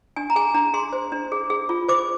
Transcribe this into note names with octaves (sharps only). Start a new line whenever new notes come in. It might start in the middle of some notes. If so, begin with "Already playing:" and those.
D4 G#5
A#5
G#4 G#5
D4 A#5
G#4 C6
C5
D4
G#4
G#4
F4
C5 D6